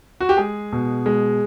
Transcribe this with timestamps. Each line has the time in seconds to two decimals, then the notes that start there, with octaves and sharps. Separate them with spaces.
0.21 F#4
0.29 G4
0.37 G#3 G#4
0.72 B2
1.06 G#3